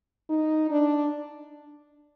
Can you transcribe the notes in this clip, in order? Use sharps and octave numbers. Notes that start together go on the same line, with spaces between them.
D#4
D4